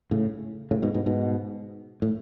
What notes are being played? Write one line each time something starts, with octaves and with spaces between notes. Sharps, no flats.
A2 C#3
A2 C#3
G#2 B2
G#2 B2
G#2 B2
A2